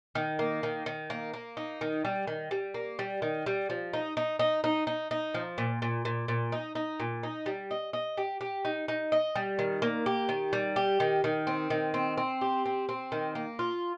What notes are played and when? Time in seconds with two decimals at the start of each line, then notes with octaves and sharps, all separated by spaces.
0.15 D#3
0.39 A#3
0.63 D#3
0.86 D#3
1.10 A#3
1.34 A#3
1.57 D#4
1.81 D#3
2.05 G3
2.27 D#3
2.51 G3
2.74 A#3
2.99 G3
3.22 D#3
3.46 G3
3.70 F3
3.94 D#4
4.17 D#4
4.39 D#4
4.64 D#4
4.87 D#4
5.11 D#4
5.34 F3
5.58 A#2
5.82 A#2
6.05 A#2
6.28 A#2
6.52 D#4
6.75 D#4
7.00 A#2
7.23 D#4
7.46 G3
7.71 D#5
7.93 D#5
8.17 G4
8.41 G4
8.65 D#4
8.88 D#4
9.12 D#5
9.36 G3
9.59 D#3
9.82 A#3
10.06 G4
10.29 D#3
10.53 G3
10.76 G4
11.00 D#3
11.24 D#3
11.47 C4
11.70 D#3
11.94 C4
12.17 C4
12.41 G4
12.66 C4
12.89 C4
13.12 D#3
13.35 A#3
13.59 F4